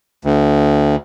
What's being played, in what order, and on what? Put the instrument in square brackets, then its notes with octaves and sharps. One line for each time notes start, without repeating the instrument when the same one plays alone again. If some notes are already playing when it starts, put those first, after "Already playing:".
[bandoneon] D2